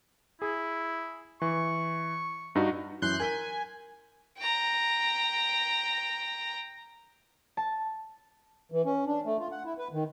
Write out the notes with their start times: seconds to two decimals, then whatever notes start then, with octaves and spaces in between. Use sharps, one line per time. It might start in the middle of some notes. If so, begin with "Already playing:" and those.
0.42 E4 G#4
1.42 E3 C#6
2.55 G2 D#4 F#4
3.02 F#2 E3 C6 F#6 G6
3.20 A#4 G#5 B6 G7
4.38 G5 A#5
7.57 A5
8.72 E3
8.85 C#4
9.07 D4
9.25 A3
9.39 F4
9.52 F#5
9.65 E4
9.78 B4
9.93 D#3